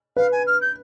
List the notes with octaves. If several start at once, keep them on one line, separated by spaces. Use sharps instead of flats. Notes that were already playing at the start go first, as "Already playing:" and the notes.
B4 F5
G#5
F6
G6